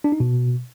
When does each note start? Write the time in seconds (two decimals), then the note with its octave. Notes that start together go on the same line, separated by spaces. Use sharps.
0.04 D4
0.12 D#4
0.20 B2